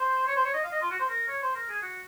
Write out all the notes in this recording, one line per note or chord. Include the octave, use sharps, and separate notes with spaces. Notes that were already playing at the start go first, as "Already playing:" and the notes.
Already playing: C5
C#5
C5
C#5
D#5
F5
D#5
F4
F#4
C5
A#4
C#5
C5
A#4
G#4
F#4